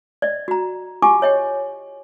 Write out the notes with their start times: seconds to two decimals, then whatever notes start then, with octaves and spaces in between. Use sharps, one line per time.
0.22 D5 D#5
0.48 F#4 A#5
1.02 F4 G4 G#5 C#6 D6
1.22 C#5 D#5 G5